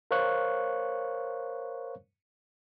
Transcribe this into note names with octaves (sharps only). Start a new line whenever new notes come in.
A#4 C5 C#5 F5 C#6 F#6